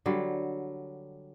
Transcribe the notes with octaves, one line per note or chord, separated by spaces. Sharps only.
D3 F#3 G3